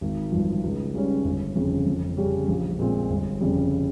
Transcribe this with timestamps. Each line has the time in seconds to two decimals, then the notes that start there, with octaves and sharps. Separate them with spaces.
0.01 G#1
0.32 G2 F3
0.63 C#2
0.94 C#3 G3 C#4
1.25 G1
1.55 F2 C#3
1.86 F2
2.17 C#3 G3 C#4 G4
2.48 A#1
2.79 A#2 G#3 C4
3.10 G1
3.40 F2 C#3 G3